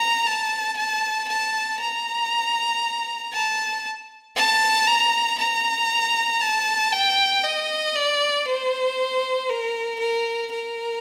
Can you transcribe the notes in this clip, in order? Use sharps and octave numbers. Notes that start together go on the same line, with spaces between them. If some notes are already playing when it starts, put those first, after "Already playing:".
Already playing: A#5
A5
A5
A5
A#5
A5
A5
A#5
A#5
A5
G5
D#5
D5
C5
A#4
A#4
A#4